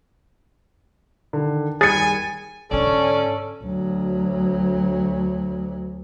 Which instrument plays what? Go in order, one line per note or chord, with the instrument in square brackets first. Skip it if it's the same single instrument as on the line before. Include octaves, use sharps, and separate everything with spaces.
[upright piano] D3 D#3
[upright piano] D#2 G3 B5 [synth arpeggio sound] G#4 [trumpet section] G#5 [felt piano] A6 C#7
[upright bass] G#2 D3 [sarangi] C#4 [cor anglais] A4 [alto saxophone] D5
[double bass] D2 F#3